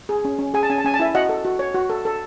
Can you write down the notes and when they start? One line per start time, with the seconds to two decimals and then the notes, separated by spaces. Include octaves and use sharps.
0.09 G#4
0.25 C#4
0.39 C#4
0.54 G#4 G#5
0.63 A5
0.70 C#4 G#5
0.78 A5
0.85 C#4 G#5
0.94 A5
0.99 E4 E5 G#5
1.15 F#4 D#5 F#5
1.29 A4
1.45 F#4
1.59 C#5
1.75 F#4
1.90 A4
2.05 A4